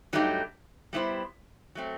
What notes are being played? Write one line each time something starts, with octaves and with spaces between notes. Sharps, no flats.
G2 F#3 A3 D#4 G4
G3 B3 E4 G4 C5
F#3 A3 C4